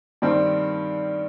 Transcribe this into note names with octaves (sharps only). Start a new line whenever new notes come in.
G2 D#3 G3 C4